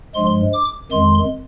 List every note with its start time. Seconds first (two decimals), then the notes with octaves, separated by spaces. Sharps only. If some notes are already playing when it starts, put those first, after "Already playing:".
0.15 G2 F3 G#3 C6
0.53 D6
0.91 F2 D#3 G#3 C6